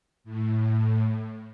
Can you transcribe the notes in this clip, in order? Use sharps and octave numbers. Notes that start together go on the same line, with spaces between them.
A2